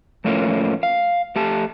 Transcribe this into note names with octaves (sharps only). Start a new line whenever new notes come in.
F2 A2 A3 A#3 C#4 F4
F5
A3 G4 A5